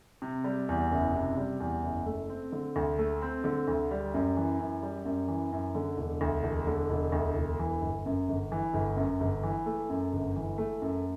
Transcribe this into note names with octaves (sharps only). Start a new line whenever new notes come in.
C3
G3
E2
F#1
C3
G3
E2
F#1
A3
C4
D3
D2
A3
C4
D3
D2
G3
F#2
E3
F#2
G3
F#2
E3
F#2
D3
E1
D2
E1
D3
E1
D2
E1
E3
G1
F#2
G1
E3
G1
F#2
G1
E3
A3
F#2
G1
E3
A3
F#2